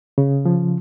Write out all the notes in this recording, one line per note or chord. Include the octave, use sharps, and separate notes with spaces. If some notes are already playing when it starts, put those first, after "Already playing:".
C#3
F3